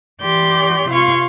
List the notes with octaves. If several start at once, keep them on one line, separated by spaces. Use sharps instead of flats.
E3 G4 D5 C6 G6
C3 F4 F5 C6 C#6 G#6